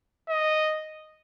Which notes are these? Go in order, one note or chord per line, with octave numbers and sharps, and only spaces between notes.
D#5